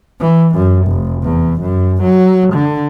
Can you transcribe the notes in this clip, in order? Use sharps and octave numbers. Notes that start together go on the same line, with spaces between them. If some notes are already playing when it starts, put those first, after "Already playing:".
E3
F#2
F1
E2
F#2
F#3
D3